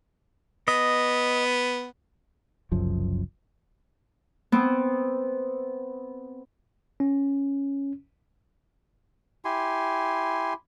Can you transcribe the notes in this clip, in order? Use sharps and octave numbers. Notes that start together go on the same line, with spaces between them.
B3 D#5
F#1 C2 F#2 F3
B3 C4
C#4
E4 G4 G#5 C6